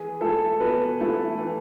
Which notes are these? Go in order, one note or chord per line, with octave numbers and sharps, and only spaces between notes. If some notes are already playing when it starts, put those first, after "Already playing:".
Already playing: E3 G#4
A3 E4 A4
B2 B4
A3 E4 A4
E3